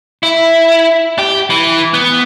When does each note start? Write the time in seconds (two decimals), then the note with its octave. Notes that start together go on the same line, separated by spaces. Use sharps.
0.23 E4
1.19 G4
1.50 E3
1.94 B3